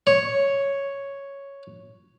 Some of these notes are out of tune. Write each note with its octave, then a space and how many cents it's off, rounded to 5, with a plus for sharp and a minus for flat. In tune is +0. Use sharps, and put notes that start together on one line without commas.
C#5 +0